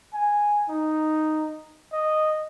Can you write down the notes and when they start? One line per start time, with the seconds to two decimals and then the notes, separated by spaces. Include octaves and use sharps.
0.14 G#5
0.69 D#4
1.93 D#5